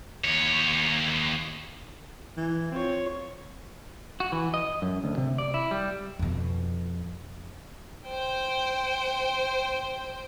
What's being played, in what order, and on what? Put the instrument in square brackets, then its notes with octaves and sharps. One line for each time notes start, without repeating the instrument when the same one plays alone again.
[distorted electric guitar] D#2 C#5
[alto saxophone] E3
[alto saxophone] C4 [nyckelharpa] F4 C#5
[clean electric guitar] F#4
E3
D#5
F#2
D2
C3
D5
E4
G3
[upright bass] F2 B2
[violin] C5 G5